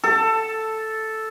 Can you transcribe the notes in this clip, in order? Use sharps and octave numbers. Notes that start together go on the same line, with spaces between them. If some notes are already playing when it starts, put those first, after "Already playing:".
A4